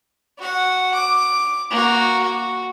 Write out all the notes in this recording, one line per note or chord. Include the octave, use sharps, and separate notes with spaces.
F#4 F#5
D6
A#3 F#4
F#4